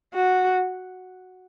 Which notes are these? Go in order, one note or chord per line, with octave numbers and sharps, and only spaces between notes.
F#4